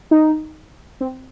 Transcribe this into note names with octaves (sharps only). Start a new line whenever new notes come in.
D#4
C4